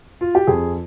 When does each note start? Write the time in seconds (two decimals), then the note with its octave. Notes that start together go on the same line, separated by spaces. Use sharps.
0.21 F4
0.35 G4
0.47 F2 G#4